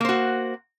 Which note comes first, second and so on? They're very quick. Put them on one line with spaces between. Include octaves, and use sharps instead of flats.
A#3 C5 F#4